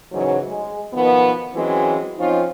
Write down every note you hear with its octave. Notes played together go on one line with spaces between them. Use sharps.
G#2 C#3 E3 F#3
G#3
B2 D#3 F3 B3
E3 F#3 G#3 C4 C#4
F3 C4 C#4 D#4 F4